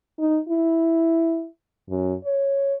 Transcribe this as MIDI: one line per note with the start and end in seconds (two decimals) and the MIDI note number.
0.19 0.38 63
0.49 1.47 64
1.90 2.14 42
2.25 2.74 73